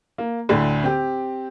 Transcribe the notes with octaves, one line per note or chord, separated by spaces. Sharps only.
A#3
D2 A2 D3
C4 G4